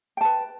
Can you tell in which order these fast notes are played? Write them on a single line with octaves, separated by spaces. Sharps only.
G5 A5 B4